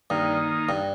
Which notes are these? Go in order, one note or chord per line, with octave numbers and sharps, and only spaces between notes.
G2 D#3 A#3 D#4
G2